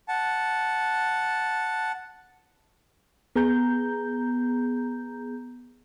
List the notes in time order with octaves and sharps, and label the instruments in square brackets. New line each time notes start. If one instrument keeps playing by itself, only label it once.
[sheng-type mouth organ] F#5 A5
[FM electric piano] B3 G#4 A#5 G6